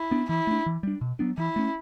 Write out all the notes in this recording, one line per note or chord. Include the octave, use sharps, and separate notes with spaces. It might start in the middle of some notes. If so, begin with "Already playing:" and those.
Already playing: E4
B3 D4
E3 E4
A3 D4
E3
G3 D4
B2
F#3 B3 D4
E3 E4
A3 C#4